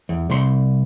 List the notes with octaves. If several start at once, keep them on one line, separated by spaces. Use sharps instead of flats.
E2
C2 C6